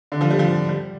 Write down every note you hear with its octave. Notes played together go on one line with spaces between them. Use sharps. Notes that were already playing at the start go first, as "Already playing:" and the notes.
D3
F3
G3
F3
G3